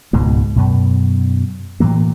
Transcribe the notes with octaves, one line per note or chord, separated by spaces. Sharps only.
C#2 G#2 B2 G#3
F#2 B2
A2 E3 F#3 A#3